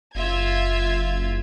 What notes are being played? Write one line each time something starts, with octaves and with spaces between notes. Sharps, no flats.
F#1 F4 E5 G#6